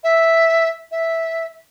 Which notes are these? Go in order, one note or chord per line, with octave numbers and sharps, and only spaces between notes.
E5
E5